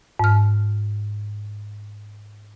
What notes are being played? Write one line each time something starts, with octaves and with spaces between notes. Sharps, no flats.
G#2 F6